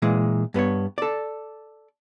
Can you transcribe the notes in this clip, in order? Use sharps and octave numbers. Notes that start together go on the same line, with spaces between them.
A#2 E3 G#3
G2 B3 B4 C#5
A4 D5